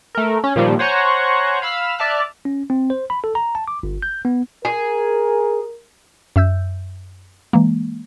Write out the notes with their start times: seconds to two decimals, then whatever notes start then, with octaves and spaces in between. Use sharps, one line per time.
0.15 A3 A#4
0.44 C#4
0.56 A#2 D#3 F3 G3
0.79 C5 C#5 F#5 G#5 A#5 C#6
1.62 F5 B5 E6 F6
1.98 D5 E5 A5 F6 F#6
2.45 C#4
2.70 C4
2.90 C5
3.10 B5
3.24 A4
3.35 A#5
3.55 A5
3.68 D6
3.83 G1
4.02 G6
4.25 B3
4.65 G#4 A#4
6.36 F#2 E5 E6 G6
7.53 E3 G#3 A#3